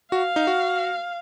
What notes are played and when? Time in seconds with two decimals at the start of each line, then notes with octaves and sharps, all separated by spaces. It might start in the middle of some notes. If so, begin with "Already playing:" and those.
0.12 F#4 F5
0.36 D#4
0.47 F#4